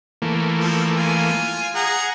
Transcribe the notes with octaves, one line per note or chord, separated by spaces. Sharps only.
E3 A3 A#3
F3
F4 G#5
G#4 F#5 A#5